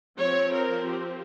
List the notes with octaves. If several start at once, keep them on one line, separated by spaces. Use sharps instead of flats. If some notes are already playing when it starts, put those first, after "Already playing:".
F3 C4 C#5
A#4
G4